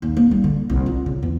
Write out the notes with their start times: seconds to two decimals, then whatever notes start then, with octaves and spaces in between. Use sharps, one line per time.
0.02 D#2
0.17 A#3
0.31 G3
0.44 D3
0.70 C2
0.86 F4
1.06 C#3
1.23 E2